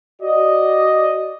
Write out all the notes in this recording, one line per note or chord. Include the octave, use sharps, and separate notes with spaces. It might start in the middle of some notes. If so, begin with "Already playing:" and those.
F#4 D5 D#5